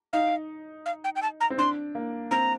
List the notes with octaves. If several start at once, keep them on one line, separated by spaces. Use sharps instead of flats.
D#4 F5
F5
G5
G5
A5
A#5
C4
D4 C6
A#3
C4 A#5